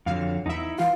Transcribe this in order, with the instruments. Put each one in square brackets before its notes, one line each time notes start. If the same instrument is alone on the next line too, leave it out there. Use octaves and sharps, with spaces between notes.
[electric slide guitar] F2 D3 F#3 [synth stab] F5
[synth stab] E2 E5 [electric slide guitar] D#4 E4
[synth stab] E3 F4 [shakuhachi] F5